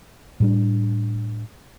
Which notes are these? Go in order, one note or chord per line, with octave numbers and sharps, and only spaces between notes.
A2 G3 D4